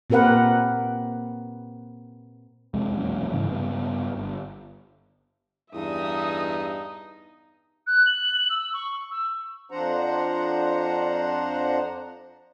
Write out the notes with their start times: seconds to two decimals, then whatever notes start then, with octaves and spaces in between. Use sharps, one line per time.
0.10 A#2 C4 G4 A#4 B4 F#5
2.74 F2 C3 G#3
2.97 E1 A#1 F#2 C#4
3.33 G#2 C#3 E3
3.48 G2 C#3 B3
4.15 G1
5.74 E2 G2 D#4 E5 D#6
7.87 F#6
8.06 F#7
8.50 E6
8.73 C#6
9.10 E6
9.71 F2 F3 D4 C5 F#5 A#5